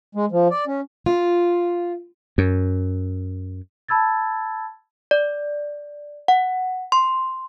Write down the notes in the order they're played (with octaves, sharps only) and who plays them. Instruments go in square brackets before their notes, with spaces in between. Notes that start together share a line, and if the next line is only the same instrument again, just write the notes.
[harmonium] G#3
F3
D5
C#4
[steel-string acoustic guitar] F4
[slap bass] F#2
[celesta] A5 B5 E6 G#6 A6
[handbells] D5
F#5
C6